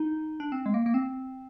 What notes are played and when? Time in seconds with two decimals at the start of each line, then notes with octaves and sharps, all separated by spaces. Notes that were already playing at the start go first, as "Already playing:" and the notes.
Already playing: D#4
0.40 D4
0.52 C4
0.66 G#3
0.74 A#3
0.86 A#3
0.94 C4